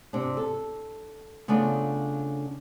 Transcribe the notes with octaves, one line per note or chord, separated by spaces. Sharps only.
C3 D4
A4
C#3 A3 B3 D4 F4